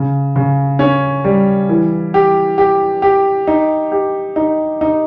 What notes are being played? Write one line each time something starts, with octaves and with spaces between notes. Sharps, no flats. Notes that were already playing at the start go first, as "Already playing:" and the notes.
Already playing: C#3
C#3
C#4
G3
E3
G4
G4
G4
D#4
G4
D#4
D#4